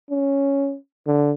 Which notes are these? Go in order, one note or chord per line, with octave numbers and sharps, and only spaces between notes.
C#4
D3